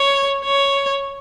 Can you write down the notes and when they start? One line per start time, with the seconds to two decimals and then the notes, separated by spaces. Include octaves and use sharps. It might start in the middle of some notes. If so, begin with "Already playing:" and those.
Already playing: C#5
0.44 C#5